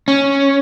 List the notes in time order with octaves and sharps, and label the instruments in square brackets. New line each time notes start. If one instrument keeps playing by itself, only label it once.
[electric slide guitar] C#4